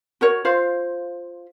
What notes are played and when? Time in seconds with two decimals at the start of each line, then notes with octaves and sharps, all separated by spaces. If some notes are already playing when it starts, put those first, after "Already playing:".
0.21 F#4 A#4 C#5
0.45 F4 C5 F5